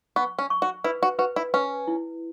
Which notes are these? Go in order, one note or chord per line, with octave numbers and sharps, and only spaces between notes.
B3 C#6
C#4
C#6
F#4
E4 B4
F#4
F#4 B4
E4
C#4 B4
E4